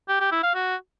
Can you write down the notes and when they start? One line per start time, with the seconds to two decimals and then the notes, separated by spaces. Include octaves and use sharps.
0.08 G4
0.20 G4
0.31 E4
0.43 F5
0.55 F#4